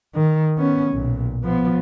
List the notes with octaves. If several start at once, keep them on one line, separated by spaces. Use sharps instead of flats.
D#3
B3 C#4
B1 A#2
F3 B3